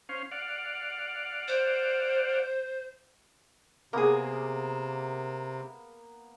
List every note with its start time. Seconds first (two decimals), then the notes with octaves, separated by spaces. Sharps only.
0.09 C#4 C5 F5
0.31 D5 F5 F#5
1.48 C5
3.93 C3 A#3 B3 G#4 A#4